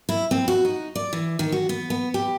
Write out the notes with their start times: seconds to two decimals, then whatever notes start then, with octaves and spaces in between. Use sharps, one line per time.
0.09 E4
0.31 C4
0.48 F#4
0.65 D#4
0.95 D5
1.13 E3
1.39 D#3
1.52 F#4
1.69 B3
1.90 B3
2.14 G4